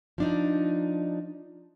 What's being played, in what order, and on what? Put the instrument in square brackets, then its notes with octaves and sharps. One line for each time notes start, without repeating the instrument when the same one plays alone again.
[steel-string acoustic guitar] F3 D4 D#4